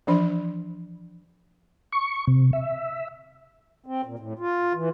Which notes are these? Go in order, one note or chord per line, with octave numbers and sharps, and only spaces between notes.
E3 F3 D4 C5 B5
C#6
C3
E5
C4
A#2
A2
F4
E3